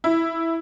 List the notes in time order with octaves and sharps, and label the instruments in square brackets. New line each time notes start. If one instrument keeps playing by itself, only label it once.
[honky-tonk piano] E4